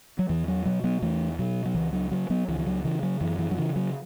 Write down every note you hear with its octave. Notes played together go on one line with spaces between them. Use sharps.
F#3
E2 E3
F#3
B2 F#3
F#3 B3
E2 E3 A3
B2 F#3
F#3
C#2 E3
F#3
C#3 F#3
F#3 B3
C#2 E3
E3
F#3
C#3 E3
F#3
F#2 E3
E3
F#3
C#3 E3
F#3